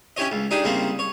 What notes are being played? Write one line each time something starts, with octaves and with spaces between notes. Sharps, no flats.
C#4 E4 G4 C#5 D#5
C#2
D4 D#4 G4 G#4
C2 C#3 A#3 C4
C#5